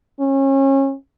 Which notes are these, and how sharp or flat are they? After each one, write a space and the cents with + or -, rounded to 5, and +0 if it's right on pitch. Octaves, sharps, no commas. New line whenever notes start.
C#4 -30